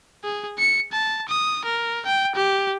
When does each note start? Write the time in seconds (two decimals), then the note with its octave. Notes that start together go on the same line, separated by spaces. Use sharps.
0.24 G#4
0.58 C#7
0.92 A5
1.28 D#6
1.65 A#4
2.06 G5
2.35 G4